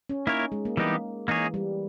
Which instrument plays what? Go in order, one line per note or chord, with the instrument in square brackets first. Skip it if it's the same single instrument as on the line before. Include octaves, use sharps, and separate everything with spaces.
[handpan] C#4
[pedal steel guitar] A#3 E4 A#4 C#5 [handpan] D#4
[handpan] G#3
A#3
[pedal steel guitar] E3 G3 B3 D#4 G4
[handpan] E3 [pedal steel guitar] A#3 D#4 G#4 C#5
[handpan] G3